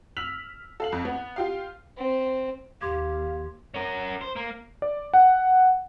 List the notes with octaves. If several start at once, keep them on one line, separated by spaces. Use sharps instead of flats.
E6 F6 B6 F7 F#7
A4 F5 F#7
F2
B3
F4 G4 F5
C4
D#2 G4 F5 C6 D6 G#6
C#4 A#4
C5
A#3
D5
F#5